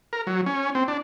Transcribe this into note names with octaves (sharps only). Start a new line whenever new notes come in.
A#4
F#3
C#4
C4
D4